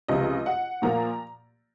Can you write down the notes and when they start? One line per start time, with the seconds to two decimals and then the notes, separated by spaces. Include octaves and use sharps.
0.08 C#2 C3 F3 D#5
0.46 F#5
0.82 A#2 F3 A#3 A#5